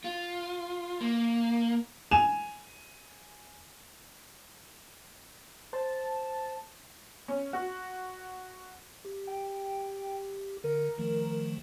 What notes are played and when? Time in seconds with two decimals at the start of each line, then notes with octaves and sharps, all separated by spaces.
0.04 F4
1.01 A#3
2.11 G#5 E7 F7
5.73 C5 A5
7.28 C#4
7.53 F#4
9.05 G4
9.27 G5
10.64 D3 A#4
10.98 D#3 F3 A3